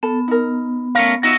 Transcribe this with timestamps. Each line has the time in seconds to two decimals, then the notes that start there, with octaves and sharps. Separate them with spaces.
0.03 B3 A4
0.28 D#4 A#4
0.95 A3 C#4 A#4 F5
1.23 D#4 F4 F#4 D#5 E5